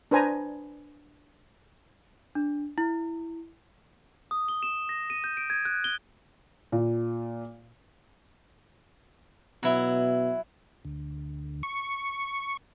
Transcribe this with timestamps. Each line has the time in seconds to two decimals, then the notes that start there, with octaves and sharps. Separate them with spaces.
0.11 D4 B4 C5 G#5 A#5
2.35 D4
2.78 E4
4.31 D#6
4.48 G7
4.63 E7
4.89 A#6
5.10 D#7
5.24 G6
5.37 D7
5.50 G#6
5.65 F#6
5.84 G7
6.72 A#2
9.63 B2 F#3 E4
10.85 D2
11.63 C#6